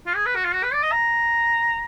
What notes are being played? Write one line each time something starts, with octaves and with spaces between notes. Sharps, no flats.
F4
G#4
B4
F#4
F4
F#4
B4
D5
D#5
A#5